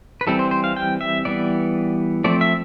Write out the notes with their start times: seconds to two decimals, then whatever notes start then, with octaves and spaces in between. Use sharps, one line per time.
0.21 B4
0.27 E3 G3 C4 A4
0.39 C5
0.51 C5
0.64 F5
0.77 G5
1.01 E5
1.25 E3 G3 B3 D5
2.24 F3 A3 C4 D5
2.41 E5